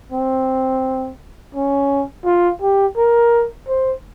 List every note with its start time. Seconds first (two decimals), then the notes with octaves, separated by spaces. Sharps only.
0.12 C4
1.55 C#4
2.25 F4
2.62 G4
2.97 A#4
3.68 C5